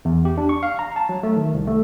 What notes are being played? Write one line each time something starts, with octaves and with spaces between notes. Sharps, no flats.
E2
G4
D4
C#6
F5
A#5
A5
F#3
A3
D#3
C2
A3